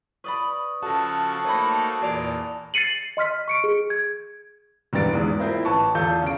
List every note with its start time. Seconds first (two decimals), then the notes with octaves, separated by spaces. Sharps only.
0.24 B4 D5 B5 C#6 D#6
0.83 C#3 F3 F#4 A4 A5 A#6
1.44 A3 A#3 D#4 C5 C#5 B5
2.01 E2 A#2 G#4 D5 B5 F7
2.74 A6 C7 C#7 D#7 F#7
3.17 D#5 C6 F6 B6
3.48 C#6 C#7 D7
3.64 G#4
3.90 G#6
4.93 E1 G2 E3 B3 A6 D7
5.13 E2 G#2 G#3
5.39 A#3 C4 E4 F4 C5
5.65 A1 B4 A5 C#6
5.95 E2 F4 A4 G6
6.22 C#3 D7